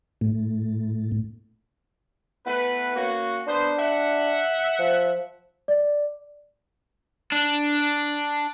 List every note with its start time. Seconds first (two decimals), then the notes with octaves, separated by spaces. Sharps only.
0.21 A2
2.46 A3 B3 E4 B4
2.95 A#3 C#4 F#4
3.47 B3 D4 C5
3.79 E5 F#5
4.79 F3
5.68 D5
7.32 D4